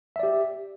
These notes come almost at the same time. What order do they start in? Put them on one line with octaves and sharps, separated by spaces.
E5 D5 G4